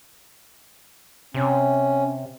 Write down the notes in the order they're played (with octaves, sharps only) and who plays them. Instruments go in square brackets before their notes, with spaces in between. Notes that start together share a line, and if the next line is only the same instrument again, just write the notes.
[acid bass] C3 [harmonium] C#4